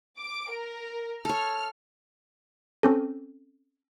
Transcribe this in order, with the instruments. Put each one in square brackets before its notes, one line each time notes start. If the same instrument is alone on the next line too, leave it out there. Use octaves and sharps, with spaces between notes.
[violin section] D6 D7
A#4
[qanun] A4 C#5 [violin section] F6
[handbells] C4 C#4 A4